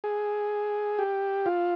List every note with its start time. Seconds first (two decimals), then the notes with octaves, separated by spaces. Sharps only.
0.04 G#4
0.99 G4
1.46 F4